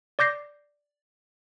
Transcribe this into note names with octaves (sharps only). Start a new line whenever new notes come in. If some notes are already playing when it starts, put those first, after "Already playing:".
D5 D6 G6 A#6 C7